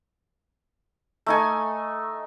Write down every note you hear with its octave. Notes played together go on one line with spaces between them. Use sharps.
A3 D#4 G#5